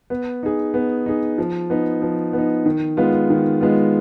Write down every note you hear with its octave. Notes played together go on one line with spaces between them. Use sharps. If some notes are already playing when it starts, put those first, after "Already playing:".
B3
D#4 G#4
B3
D#4 G#4
F3
B3 D#4
F3
B3 D#4
D#3
G#3 B3 F4
D#3
G#3 B3 F4